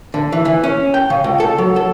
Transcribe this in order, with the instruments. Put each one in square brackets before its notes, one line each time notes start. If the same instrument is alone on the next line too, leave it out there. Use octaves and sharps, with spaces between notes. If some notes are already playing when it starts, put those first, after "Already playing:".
[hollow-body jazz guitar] D3
E3
E3
C#4
G5
C#3
C#2
A4
F#3
A4